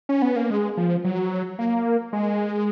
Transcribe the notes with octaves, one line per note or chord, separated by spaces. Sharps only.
C#4
B3
A#3
G#3
F3
F#3
A#3
G#3